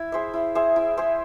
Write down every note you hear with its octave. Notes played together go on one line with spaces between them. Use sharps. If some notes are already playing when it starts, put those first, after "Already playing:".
Already playing: E4
G#4 C5 E5
E4
G#4 C5 E5
E4
G#4 C5 E5